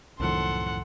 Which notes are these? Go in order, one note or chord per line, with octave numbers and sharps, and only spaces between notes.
C2 F#2 A2 D#3 F3 A4 F#5 C6